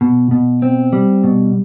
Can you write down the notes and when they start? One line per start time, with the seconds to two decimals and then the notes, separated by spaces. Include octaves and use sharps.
0.01 B2
0.31 B2
0.62 C4
0.93 G3
1.24 B2